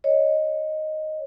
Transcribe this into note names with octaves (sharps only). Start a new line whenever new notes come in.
C#5 D#5